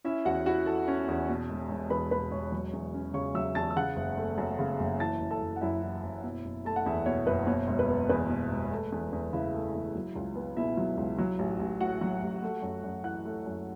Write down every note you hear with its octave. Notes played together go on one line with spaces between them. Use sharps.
C#4 E4 E5
E2 F#4 F#5
E4 F#4 F#5
E3 A4 A5
C#4
E2
B2
E1
E1
E2 B4 B5
B2 B4 B5
E1 C#5 C#6
F#3
E2
C#4
C#3 C#5 C#6
F#3 E5 E6
E2 A5 A6
E6
C#3 F#5 F#6
F#1
A3
F#2
C#3
F#1
E3 A5 A6
F#1
A4 A5
F#1
F#5
F#2 E4 E5
E3
F#1
B2
F#1
A3 A5
F#5
E2 E4 E5
B2 C#5
F#1 B4
B2 C#5
E1
B4
B3
E2 B4
B2
E1
A3
E2
E2
C#3 E4 E5
A3
E2
F#3
C#2
B3
B2 E4 E5
F#3
C#2
F#3
A1
A1
A2 F#4 F#5
F#3
A1
A3
F#2
F#2
E3 F#5 F#6
A3
F#2